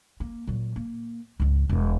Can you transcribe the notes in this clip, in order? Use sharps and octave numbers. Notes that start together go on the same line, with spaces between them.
A#3
A#2 F#3
A#3
C#2 G#2
E1 G2